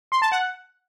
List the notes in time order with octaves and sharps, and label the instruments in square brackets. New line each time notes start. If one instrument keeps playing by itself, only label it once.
[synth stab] C6
A5
F#5